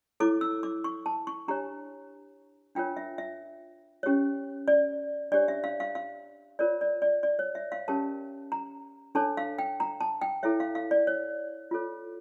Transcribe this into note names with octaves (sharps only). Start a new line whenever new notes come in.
E4 A4 C#5 D6
E6
D6
C#6
A5
C#6
D4 G4 C#5 A#5
D4 F4 A#4 C#5 G5
E5
E5
C#4 G4 C#5
D5
D4 G4 C#5 D5
E5
F5
F5
F5
F4 A#4 C#5 D5
D5
D5
D5
C#5
E5
F5
C#4 G4 A#4 C#5 A5
A#5
D4 A4 C#5 A5
F5
G5
A#5
A5
G5
E4 A4 C#5 E5
F5
F5
D5
C#5
F4 A4 C#5